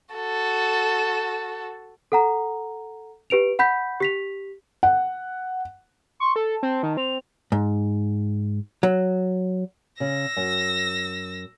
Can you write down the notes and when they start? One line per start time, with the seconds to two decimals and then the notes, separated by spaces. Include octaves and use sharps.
0.15 F#4 A4
2.12 A4 F#5 A#5
3.30 G4 B4 D7 F7
3.59 F#5 B5 G6 B6
4.00 G4 B6 F7
4.83 F#5
6.20 C6 C#6
6.36 A4 A5
6.63 C4
6.83 D#3
6.97 C4 F7
7.52 G#2
8.83 F#3
10.00 C#3 E6 A#6
10.37 F#2